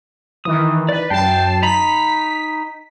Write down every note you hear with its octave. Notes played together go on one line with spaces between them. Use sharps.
D#3 E3 D#6
B4 D5
F#2 G5 A5 C7
D#4 A#5 B5 B6